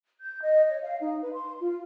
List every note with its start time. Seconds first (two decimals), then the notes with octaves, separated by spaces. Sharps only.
0.20 G6
0.41 D#5
0.69 C#5
0.83 F5
1.01 D#4
1.21 B4
1.33 C6
1.60 F4